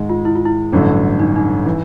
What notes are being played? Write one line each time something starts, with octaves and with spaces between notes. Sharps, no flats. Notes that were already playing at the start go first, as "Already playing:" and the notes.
Already playing: G#2 D#3 G#3
F4
E4
F4
E4
A1 G2 D3 F#3 A3
D#4
D4
D#4
E3